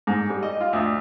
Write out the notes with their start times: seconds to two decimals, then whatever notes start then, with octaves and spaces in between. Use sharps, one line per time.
0.07 G#2
0.30 G3
0.43 D#5
0.61 F4
0.73 D2